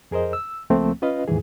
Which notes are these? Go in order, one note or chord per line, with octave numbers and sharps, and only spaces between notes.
F2 G#4 A#4 C5 D#5
E6
C#2 F3 A3 A#3 C4
C#4 F4 B4 D#5 F5
D#2 G#2 D#3 E3 G#4